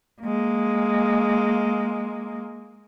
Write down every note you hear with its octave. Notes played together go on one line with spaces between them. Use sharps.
G#3 A#3